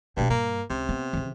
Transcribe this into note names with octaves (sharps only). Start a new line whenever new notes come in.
G2 B2 A#3
G2 A#3
C#2 C3
B3
C#3 E3